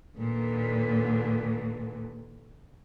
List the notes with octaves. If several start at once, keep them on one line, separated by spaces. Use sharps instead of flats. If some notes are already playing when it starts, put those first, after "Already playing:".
D#2 A#2 D3 B3